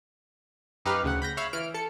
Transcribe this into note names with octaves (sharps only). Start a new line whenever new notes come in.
F#2 D#4 G4 B4 F5 F6
D2 C#3 F#5
B5 G6 A#6
C#5 E5 F5 B5
E3 F6 D7
A4 C#7